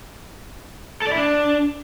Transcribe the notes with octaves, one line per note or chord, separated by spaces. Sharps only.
A4
D5
E4
D4